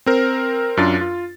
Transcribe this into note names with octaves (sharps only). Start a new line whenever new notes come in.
C4 A#4 C5
F#2 D4 F4 A6
F4